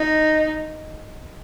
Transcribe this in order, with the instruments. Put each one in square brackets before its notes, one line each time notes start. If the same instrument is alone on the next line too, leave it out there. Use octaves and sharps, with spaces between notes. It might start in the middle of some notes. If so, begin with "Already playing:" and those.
Already playing: [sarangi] D#4